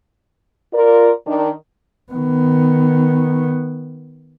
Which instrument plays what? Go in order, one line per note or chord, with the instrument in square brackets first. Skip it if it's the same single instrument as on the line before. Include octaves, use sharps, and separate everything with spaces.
[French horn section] F4 A#4 D5
D#3 D4
[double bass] D#3 B3